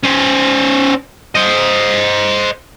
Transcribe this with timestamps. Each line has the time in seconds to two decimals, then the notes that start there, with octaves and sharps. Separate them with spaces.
0.03 C#4 C5
1.35 C5 D#5